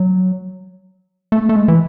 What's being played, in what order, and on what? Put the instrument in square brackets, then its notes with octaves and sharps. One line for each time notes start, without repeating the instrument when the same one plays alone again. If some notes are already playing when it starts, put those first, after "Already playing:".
Already playing: [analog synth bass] F#3
A3
A3
G#3
E3